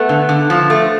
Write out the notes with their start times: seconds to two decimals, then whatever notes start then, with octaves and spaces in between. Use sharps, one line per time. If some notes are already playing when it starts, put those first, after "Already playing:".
Already playing: A3 B3
0.09 D3
0.29 D3
0.50 F3
0.70 A3